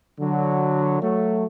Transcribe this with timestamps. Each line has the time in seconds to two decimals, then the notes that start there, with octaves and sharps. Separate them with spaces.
0.20 D3 F#3
1.01 F#3 A3